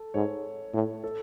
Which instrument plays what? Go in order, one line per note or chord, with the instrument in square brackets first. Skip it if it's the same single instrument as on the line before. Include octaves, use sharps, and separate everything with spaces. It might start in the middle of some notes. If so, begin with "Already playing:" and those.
Already playing: [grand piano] A4
[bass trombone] G#2 [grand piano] C#5
[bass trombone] A2
[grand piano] A4